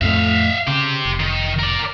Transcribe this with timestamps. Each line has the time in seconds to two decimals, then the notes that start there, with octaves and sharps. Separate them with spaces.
0.01 F2 A2 A3 E5 F5
0.67 C#3 G4 C5
1.05 F1
1.19 D#3
1.59 A#4 D5